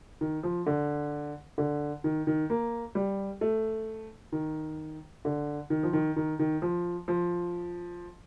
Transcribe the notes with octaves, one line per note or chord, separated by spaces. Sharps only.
D#3
F3
D3
D3
D#3
D#3
A#3
G3
A3
D#3
D3
D#3
F3
D#3
D#3
D#3
F3
F3